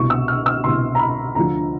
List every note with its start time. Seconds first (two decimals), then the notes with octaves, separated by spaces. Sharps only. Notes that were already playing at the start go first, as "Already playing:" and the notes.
Already playing: C2 B2 C#6
0.10 E6
0.28 F6
0.46 E6
0.64 C2 B2 C6
0.95 A#5
0.99 B5
1.35 D2 D3 F3 A#5